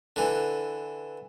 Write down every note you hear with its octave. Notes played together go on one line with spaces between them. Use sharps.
D3 E3